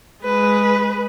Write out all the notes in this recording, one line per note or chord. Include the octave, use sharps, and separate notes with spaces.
G#3 B4